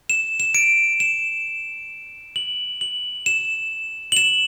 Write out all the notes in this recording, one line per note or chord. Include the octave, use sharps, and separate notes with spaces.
E7
E7
D7
E7
F#7
F#7
E7
F#7
E7